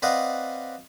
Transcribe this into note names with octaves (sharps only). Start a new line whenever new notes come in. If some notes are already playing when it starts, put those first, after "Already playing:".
C4 B4 D5 D#5 F5 F#5